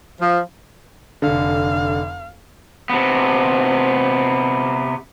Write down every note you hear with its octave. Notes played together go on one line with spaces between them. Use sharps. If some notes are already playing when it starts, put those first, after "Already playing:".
F3
F1 D3 F5
C3 B3